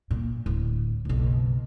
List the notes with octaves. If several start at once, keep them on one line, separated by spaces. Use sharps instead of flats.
A#2
D1
F#1 B1